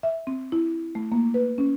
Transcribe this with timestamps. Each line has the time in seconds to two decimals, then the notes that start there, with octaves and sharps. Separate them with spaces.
0.03 E5
0.27 C4
0.52 E4
0.95 A3
1.12 A#3
1.34 B4
1.58 C#4